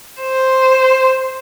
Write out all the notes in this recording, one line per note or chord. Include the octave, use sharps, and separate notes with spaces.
C5